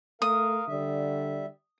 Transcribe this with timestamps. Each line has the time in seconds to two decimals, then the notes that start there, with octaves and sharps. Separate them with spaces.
0.22 A3 A#4 F5 D#6
0.68 D3 G3 E5